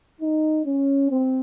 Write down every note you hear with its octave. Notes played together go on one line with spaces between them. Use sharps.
D#4
C#4
C4